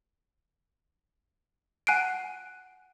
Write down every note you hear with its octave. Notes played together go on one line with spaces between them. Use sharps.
F#5 G#5 F#6 C7 D7